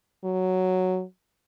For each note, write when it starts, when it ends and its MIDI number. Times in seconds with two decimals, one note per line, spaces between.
0.24 1.04 54